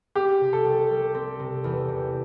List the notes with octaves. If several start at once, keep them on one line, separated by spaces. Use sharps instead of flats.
C4 G4
C3
A4
C2
G3
C4
C3
E2
C3